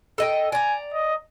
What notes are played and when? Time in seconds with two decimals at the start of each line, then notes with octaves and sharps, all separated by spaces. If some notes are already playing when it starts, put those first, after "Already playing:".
0.18 A4 D#5 G5
0.52 D5 G#5 A#5
0.94 D#5